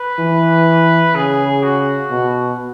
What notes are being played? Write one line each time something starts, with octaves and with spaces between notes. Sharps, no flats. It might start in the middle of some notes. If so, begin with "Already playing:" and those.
Already playing: B4
E3
C#3 G#4
F#4
B2